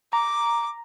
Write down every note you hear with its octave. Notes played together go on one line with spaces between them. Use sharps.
A#5 D6